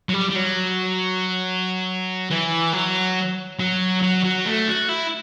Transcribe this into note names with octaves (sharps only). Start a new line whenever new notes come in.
F#3
G3
G3
F#3
E3
F#3
F#3
F#3
F#3
A3
F#4
E4